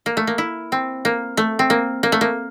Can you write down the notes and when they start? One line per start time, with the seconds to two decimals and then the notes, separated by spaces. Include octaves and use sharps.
0.06 A#3
0.17 A3
0.27 A#3
0.38 E4
0.72 C4
1.05 A#3
1.37 A3
1.59 C4
1.70 A#3
2.03 A#3
2.12 A3
2.21 A#3